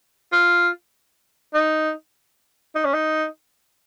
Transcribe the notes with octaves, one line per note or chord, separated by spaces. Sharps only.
F4
D#4
D#4
C#4
D#4